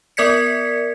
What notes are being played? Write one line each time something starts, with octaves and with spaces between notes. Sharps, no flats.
B3 A#4 D5 G#6 B6 C#7